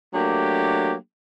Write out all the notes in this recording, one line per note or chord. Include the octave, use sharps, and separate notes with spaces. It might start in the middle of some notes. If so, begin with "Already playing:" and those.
F#3 A3 A#3 D4 G4